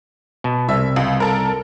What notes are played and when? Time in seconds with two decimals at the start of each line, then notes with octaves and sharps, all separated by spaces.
0.44 B2
0.69 C2 E5
0.96 C#2
1.20 A4 A#4